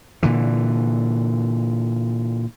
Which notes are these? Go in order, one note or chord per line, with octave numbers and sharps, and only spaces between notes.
A#2 D3 E3